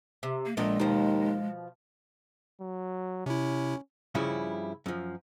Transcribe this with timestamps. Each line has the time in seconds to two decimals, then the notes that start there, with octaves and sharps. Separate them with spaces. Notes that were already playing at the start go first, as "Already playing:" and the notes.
0.23 C3
0.46 A#3
0.57 A#1 A#2 G#3 A3 D#5
0.80 D#2 B2 F3
2.61 F#3
3.26 C3 C#4 E4
4.15 G2 C#3 F3 G3 C#4 E4
4.86 F#2 F3